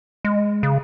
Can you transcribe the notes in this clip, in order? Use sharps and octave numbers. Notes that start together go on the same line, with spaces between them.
G#3
C#3